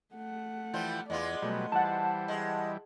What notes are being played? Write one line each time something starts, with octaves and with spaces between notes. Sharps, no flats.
A3 F#5
E3 F3 G3 F4 G5
E2 G#3 B3 F4 D5
B2 F#3 G3 A3
E3 G3 C5 F#5 A5
G#3